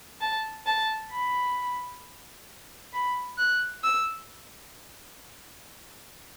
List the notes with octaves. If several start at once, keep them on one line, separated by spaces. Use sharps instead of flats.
A5
A5
B5
B5
F#6
E6